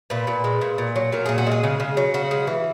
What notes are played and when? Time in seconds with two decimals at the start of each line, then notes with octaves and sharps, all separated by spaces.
0.10 A#2 B4
0.27 A#2
0.44 G#3
0.61 A#2
0.78 A#2
0.96 F#3
1.12 A#2 A#4
1.26 A#2 G#4
1.38 F#4
1.47 G#3 G#4
1.63 C#3
1.80 C#3
1.97 F#3
2.14 C#3 F#4
2.31 G#3
2.47 E3